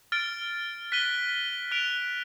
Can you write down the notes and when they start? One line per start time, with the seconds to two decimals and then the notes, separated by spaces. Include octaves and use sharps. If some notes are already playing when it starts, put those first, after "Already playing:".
0.12 F6 A6 D7
0.92 F#6 B6 D#7 G7
1.71 F#6 B6 D7 F7